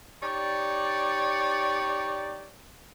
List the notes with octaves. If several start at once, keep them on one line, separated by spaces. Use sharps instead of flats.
D#4 G4 C#5 D5